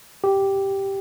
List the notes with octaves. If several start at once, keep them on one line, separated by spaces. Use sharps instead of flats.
G4